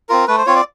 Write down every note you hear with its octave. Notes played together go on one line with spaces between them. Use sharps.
C4 F4 A#4
A3 B4
C5
C4 F4 C#5
D5